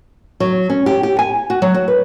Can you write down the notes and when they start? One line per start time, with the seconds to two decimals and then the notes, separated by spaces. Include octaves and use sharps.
0.40 F#3
0.70 C#4
0.86 G4
1.03 G4
1.19 G#5
1.50 F#4
1.62 F#3
1.74 F#4
1.88 B4